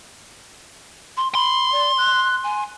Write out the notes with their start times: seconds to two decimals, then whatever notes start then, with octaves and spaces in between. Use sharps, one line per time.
1.17 C6
1.35 B5 C6
1.72 D5
1.98 F#6
2.44 G#5